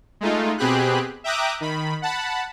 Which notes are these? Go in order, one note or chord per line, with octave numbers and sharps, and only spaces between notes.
G#3 A3 D#4 F4
B2 C4 G4 G#4 B5 F#6
E5 G5 A#5 D6 D#6 F#6
D#3 B5
F#5 A5 B5